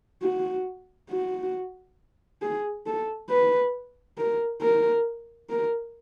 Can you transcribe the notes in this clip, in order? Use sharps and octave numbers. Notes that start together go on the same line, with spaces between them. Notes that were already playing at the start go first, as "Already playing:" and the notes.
F#4
F#4
G#4
A4
B4
A#4
A#4
A#4